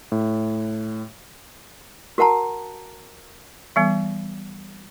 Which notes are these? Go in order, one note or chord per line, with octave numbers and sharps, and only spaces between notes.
A2
F#4 A#4 F#5 A5 A#5
E3 G3 B3